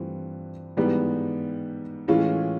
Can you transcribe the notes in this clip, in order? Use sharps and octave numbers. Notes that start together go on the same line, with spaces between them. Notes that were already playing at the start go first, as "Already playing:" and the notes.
Already playing: G2 E3 A3 C4 F4
G#2 E3 G3 B3
A2 E3 G#3 C#4 F4